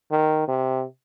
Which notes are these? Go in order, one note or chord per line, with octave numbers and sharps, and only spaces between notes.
D#3
C3